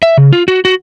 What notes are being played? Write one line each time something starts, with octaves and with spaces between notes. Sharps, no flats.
E5
C#3
F4
F#4
F#4